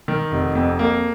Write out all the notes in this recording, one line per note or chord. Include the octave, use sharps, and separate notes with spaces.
D#3
F1
F2
A#3